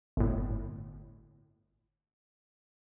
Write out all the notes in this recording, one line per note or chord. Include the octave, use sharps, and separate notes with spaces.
G1 A2